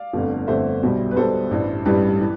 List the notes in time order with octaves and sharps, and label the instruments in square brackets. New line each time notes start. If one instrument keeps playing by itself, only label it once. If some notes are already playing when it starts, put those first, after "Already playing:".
Already playing: [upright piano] D5 F5
G1 F2 D3 A3
G1 F2 D3 A3 C5 E5
B1 B2 G3
B4
B1 B2 G3 A4 C5
A1 G2 E3 G3
A1 G2 E3 G3 G4 B4
E3